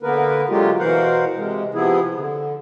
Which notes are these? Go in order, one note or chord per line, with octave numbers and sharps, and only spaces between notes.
D3 A#3 B3 A#4 B4
D3 F#3 G#3 A#3 F4 G4
B2 E3 A#4 C5 F5 F#5
C3 G#3
C3 F3 B3 E4 G#4
D3